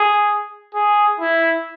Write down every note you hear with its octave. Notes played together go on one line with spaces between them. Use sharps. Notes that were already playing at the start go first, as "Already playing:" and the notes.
Already playing: G#4
G#4
E4